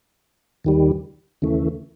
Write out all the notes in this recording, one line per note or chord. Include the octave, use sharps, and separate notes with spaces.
D#2 D#3 G3
D#2 C#3 E3 A3